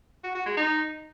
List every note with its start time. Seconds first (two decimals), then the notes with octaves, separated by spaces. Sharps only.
0.24 F#4
0.35 F#4
0.46 G#3
0.57 D#4